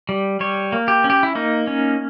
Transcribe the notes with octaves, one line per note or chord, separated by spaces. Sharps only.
G3
G3 C#5
A#3
G4
C#4
G4
E4
A#3 D#4
C#4